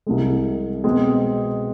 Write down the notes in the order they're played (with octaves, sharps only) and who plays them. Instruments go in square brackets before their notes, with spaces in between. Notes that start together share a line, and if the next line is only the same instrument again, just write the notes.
[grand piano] C2 C3 G#3
B2 G#3 C4 G#4